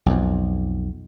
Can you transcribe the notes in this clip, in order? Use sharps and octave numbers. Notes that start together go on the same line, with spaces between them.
B1 F2